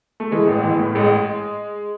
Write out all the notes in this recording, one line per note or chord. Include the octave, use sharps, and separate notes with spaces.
A3
E3 G#3
A1
E3
A2
A1 G#3